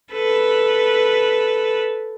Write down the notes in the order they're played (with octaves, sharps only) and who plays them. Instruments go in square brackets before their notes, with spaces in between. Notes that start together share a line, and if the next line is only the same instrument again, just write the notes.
[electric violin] A4 B4